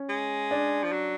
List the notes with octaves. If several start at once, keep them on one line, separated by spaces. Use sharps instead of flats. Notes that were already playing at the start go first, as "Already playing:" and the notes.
Already playing: C#4
G#3
D4
F3
F#3